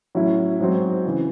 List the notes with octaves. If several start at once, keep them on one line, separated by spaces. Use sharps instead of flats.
A2 F#3 C#4 E4
G#2 F#3 C4
C#3 E3